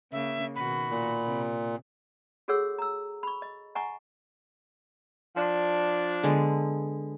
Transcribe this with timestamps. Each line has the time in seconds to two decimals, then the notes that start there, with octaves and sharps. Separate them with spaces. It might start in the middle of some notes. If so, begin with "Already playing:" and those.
0.12 C#3 A#3 E5
0.56 B2 D#3 F#4 B5
0.90 A#2
1.25 C3
2.48 F#4 G#4 A4 C#5 F#5 E6
2.79 A#5 E6
3.23 B5 C#6
3.42 D#5
3.75 D#5 F#5 G#5 A#5 C#6
5.37 F3 D4
6.23 D3 G#3 B3